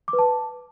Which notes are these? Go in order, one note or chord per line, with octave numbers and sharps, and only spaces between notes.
D6
B4
A5